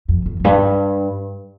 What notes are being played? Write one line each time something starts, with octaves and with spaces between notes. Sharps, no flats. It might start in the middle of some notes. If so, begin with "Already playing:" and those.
F2
F2
F2
G2